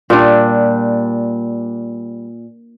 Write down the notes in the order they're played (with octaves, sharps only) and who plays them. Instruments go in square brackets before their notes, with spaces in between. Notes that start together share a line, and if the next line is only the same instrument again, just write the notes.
[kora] A#2 G3 D4